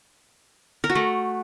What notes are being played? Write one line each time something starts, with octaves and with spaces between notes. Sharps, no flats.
A#4
F#4
A3